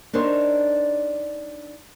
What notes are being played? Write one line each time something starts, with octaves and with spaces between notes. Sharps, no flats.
D4 D#4 A#4 C5 C#5